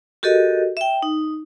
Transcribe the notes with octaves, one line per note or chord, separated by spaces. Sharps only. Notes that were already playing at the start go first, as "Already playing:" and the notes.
F#4 G4 A4 A#4 D#5
E5 G5
D#4